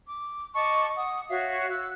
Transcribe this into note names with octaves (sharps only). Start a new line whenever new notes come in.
D6
D#5 A5 C#6 D6
F#5 D#6
F#4 C#5 E5 F5
E6 F#6